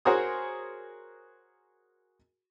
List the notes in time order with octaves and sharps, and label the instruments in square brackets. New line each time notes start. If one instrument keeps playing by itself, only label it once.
[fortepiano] F#4 G#4 A#4 C5 C#5 D#6